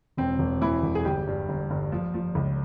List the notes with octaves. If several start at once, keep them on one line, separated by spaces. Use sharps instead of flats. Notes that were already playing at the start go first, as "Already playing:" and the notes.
E1 C4
E1
E3 E4
E1
G#4
G1 G4
G2
G1
G1
F3
F3
C#2